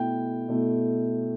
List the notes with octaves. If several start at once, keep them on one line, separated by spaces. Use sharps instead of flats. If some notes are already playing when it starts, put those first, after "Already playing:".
Already playing: B2 A3 E4 G5
B2 A3 E4